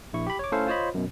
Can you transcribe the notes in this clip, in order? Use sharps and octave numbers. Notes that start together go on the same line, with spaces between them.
A#1 E4 C#6
G4 B5
C#5 D6
A3 C#4 E4 A4 C5 F5
F4 C5 C#5 D#5 B5
F#2 B2